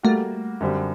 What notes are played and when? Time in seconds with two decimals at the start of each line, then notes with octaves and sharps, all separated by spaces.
0.03 G3 A3 A#3 F#4
0.61 F#2 D3 G3 C4